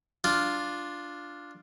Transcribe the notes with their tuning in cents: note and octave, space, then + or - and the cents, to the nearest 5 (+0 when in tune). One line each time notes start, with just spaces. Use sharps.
D4 +0 F4 +0